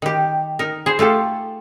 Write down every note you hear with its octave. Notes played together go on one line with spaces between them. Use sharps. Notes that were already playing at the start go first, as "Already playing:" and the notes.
D#3 G4
D#4 A#4
G#4 C5
A3 F4 G4 A4